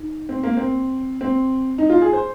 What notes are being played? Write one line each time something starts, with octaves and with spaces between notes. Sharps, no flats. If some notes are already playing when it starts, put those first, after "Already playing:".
Already playing: D#4
C4
A#3
C4
C4
D#4
F4
G#4
C5